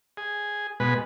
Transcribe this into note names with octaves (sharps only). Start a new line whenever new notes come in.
G#4
B2 G#3 B4